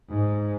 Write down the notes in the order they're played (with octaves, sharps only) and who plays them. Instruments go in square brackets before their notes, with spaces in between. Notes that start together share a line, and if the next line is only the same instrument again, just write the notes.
[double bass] G#2